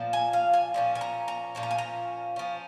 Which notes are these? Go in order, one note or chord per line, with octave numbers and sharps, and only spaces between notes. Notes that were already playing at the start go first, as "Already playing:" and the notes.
Already playing: A#2 F3
G#5
F5
G#5
A#2 F3 C#4
G#5
A#5
A#5
A#2 F3 C#4
A#5
G#5
A#5
F3 C#4